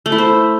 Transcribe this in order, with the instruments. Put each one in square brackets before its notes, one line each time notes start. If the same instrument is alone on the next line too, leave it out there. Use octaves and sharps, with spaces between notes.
[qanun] A3
E4
C5